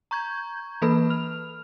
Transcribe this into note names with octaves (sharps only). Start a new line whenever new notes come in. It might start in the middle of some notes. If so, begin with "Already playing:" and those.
A#5 C#6 G6 G#6
E3 A#3 A4 B4 B5
F6 F7